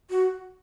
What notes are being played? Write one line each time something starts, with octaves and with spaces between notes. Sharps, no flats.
F#4